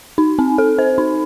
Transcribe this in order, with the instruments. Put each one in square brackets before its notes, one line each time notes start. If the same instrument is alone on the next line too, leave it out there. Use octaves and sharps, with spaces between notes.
[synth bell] D#4
C4
A4
C5
D#4